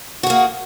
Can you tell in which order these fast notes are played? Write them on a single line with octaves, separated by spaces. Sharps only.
F#4 G#4 A#3